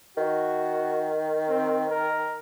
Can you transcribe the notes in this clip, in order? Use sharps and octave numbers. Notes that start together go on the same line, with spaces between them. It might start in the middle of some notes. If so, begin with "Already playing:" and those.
D#3 F#4
C4
A#4